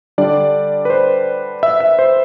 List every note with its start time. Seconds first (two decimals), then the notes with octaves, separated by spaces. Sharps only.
0.18 D3 G3 D4 D5
0.85 B4
0.90 C5
1.63 E5
1.80 E5
1.99 C5